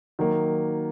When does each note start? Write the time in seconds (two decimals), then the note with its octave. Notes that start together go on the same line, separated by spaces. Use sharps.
0.19 D#3 F#3 A#3